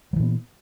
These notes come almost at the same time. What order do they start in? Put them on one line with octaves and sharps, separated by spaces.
F#3 E3 A#2 B3